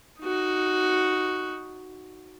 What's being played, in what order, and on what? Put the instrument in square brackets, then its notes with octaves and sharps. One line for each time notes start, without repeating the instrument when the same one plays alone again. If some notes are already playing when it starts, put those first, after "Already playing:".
[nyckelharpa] D#4 F#4